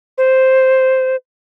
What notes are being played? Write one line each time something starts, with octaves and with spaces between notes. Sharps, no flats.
C5